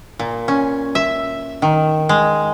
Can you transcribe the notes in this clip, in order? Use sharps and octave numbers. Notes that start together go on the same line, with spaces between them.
A#2
C#4
E5
D#3
G#3